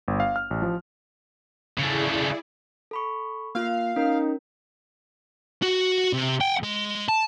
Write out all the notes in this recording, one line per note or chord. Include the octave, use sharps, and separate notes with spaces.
G1
F5
F6
A1
F3
C#3 A3 E4 G#4 D5
A4 B5 C#6
A#3 F4 F5
C#4 D#4 A#4
F#4
C3
F#5 G5
G#3
A5